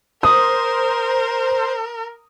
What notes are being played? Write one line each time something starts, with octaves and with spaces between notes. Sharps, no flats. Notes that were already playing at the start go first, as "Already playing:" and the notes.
A#4 C5 D#6